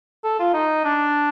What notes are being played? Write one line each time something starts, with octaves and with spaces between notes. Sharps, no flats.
A4
F4
D#4
D4